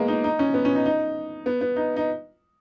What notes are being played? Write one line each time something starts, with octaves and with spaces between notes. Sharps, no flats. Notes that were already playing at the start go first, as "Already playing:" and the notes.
Already playing: G#3 A#3 B3
D#4
D#4
C#4
B3
C#4
D#4
D#4
B3
B3
D#4
D#4